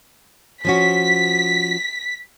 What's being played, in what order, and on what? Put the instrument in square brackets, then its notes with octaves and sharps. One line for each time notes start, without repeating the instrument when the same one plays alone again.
[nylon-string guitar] F3 C#4 F#4 [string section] B6